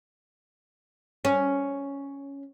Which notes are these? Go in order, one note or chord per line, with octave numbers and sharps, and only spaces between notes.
C#4